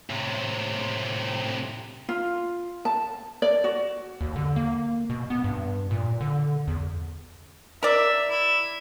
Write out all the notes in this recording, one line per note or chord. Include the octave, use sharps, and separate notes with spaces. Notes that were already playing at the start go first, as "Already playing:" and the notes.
A2 C3
F4
A5
D5
F#4
D#2
D3
A#3
B2
B3
G2
A#2
D3
E2
A#4 D5 E5
E4